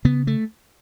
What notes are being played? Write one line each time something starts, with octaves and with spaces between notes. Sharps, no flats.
C#3 B3
A3